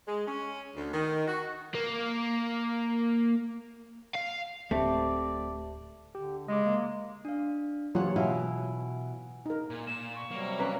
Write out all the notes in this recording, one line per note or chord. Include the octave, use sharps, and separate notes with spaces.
G#3
C#4
D2
D#3
F#4
A#3
F5
D1 A3 C4 G4 D5 E5 A5
D3 G4
C#3 G#3 D#5 D6
A#3
D4 F5
C#3 E3 F#3 A#3 F4 G4 C#5 F#5
B2 E4 F5 F#5 G#5
D#4 A#4
A#2
A#2 E7
C#6
C3 F#3 G3 A#3
C#4 B4 A#5 F#6